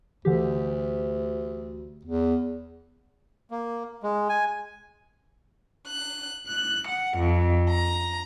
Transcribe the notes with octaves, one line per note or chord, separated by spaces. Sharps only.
D2 D3 E3 G4
E2
A#3
G#3
G#5
F#6
F#6
F#5
F2
A#5